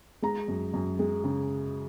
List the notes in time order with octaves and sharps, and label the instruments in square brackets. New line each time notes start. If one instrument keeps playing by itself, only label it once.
[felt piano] G#3 A#5
F#2
F#2
G#3
C#3